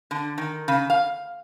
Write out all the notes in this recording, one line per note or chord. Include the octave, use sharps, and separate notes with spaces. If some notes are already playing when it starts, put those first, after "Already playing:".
D3
D#3
C#3
F5